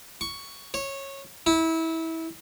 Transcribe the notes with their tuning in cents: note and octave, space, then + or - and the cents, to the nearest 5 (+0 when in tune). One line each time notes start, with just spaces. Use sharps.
C#6 +10
C#5 -15
E4 -25